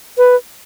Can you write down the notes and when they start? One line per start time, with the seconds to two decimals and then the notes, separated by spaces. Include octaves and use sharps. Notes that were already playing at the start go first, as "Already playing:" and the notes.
0.18 B4